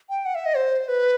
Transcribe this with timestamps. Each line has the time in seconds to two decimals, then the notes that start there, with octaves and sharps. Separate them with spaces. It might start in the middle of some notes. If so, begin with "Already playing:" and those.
0.10 G5
0.26 F#5
0.35 E5
0.46 D#5
0.56 C5
0.88 B4